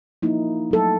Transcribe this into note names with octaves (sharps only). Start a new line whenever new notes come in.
F3 A#3 D#4 E4
F#3 A4